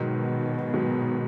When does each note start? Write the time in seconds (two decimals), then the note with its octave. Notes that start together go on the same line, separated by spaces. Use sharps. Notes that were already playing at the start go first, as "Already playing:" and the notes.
Already playing: G#2 B2 D#3 F#3
0.74 G#2 D#3 F#3